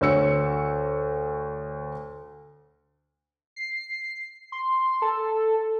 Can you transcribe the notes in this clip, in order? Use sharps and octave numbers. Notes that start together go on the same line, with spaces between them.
D2 C#5 E6 C#7
C7
C6
A4